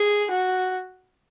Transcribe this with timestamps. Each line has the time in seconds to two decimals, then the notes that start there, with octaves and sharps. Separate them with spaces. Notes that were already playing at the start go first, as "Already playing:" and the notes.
Already playing: G#4
0.30 F#4